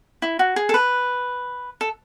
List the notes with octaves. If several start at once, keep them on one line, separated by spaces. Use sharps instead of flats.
E4
F#4
G#4
A4
B4
A4